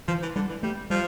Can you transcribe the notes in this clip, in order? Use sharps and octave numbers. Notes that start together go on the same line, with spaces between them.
E3 F3
E3
D3 G3
E3
G3 A3
F3 G3